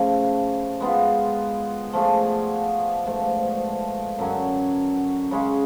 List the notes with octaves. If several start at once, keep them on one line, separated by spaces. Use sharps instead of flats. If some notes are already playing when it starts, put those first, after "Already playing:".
Already playing: C#3 F3 A3
G#3 B3 F4
F3 A3 D4 G#4
G#2 F3 A3
F#2 D3 F#3 C#4
C#3 G#3 C#4